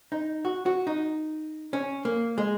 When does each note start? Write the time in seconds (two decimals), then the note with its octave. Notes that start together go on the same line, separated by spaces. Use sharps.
0.12 D#4
0.45 F#4
0.66 F#4
0.87 D#4
1.73 C#4
2.05 A#3
2.38 G#3